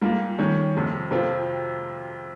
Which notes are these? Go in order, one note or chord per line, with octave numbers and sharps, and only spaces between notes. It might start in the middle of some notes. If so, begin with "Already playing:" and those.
G#2 G3 A#3 F4
D#3 G3 C#4
F2 C3 F3
F2 C3 F3 C4 F4